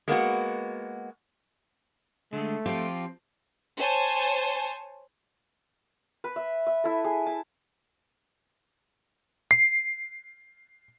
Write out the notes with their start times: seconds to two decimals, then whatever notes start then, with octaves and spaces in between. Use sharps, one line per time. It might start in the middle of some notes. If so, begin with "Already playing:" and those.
0.08 G#3 A#3 B3 F#4
2.33 D3 G#3 A3
2.66 F3 C4 F4 G4
3.76 C5 C#5 G#5 A5
6.24 B4
6.36 E5
6.67 E5
6.84 E4 A4
7.04 G#4
7.26 A5
9.51 C7